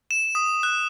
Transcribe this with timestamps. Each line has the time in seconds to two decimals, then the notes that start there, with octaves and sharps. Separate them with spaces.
0.11 E7
0.35 D#6
0.63 F#6